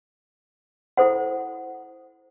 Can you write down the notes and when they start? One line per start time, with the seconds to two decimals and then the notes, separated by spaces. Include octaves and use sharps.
0.97 E4 A4 C5 F#5